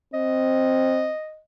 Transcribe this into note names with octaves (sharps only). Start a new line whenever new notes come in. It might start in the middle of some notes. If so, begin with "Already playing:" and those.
C4 D#5